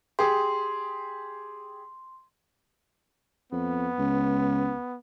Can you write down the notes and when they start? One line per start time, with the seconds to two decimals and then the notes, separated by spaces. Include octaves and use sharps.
0.19 G4 G#4 C6
3.52 F2 B3
3.99 C#2